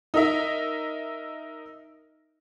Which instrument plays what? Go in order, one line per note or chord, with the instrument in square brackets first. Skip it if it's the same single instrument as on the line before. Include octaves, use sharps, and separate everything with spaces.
[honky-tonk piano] D#4 A#4 E5